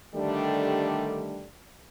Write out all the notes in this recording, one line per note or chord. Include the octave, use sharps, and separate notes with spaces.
D3 D#3 G3 A3 D4 G4